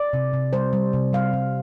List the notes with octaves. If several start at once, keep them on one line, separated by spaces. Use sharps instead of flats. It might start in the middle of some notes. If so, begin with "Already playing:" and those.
Already playing: D5
C3
C3
G3 C5
G3
C3
G3 F5
G3